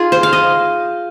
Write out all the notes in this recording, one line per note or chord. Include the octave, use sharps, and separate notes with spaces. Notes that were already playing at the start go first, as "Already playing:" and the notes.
Already playing: D#4 F4 G#4
C5
F5
D#5